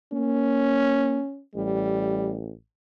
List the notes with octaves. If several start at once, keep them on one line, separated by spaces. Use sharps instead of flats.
A#3 C#4
A1 G3